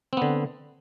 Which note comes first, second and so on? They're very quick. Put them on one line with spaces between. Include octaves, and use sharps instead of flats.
C4 B3 D3